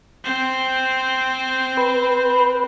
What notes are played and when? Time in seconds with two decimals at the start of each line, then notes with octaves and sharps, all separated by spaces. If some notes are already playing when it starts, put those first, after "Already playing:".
0.24 C4 C5
1.77 B4